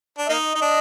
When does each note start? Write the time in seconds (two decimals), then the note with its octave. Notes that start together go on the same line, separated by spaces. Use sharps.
0.18 D4
0.28 A#3 D#4 D#5
0.55 D#4
0.62 D4